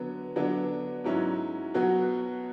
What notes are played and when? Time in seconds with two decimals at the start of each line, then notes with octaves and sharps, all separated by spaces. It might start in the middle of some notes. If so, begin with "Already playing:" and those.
Already playing: D3 F#3 B3
0.36 D3 F#3 B3 D4
1.04 G#2 F#3 C#4 E4
1.74 B2 F#3 B3 F#4